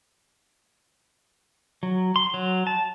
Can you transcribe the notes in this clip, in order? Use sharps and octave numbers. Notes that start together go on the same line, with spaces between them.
F#3
C6
F#3
A5